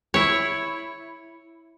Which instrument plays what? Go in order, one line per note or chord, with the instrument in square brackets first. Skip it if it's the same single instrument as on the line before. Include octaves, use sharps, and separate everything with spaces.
[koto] E4 C#5